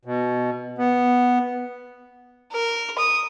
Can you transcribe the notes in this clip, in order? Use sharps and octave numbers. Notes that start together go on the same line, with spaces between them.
B2
B3
A#4
D#6